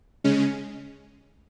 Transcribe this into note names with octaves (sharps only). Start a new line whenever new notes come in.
C#3 G#3 C#4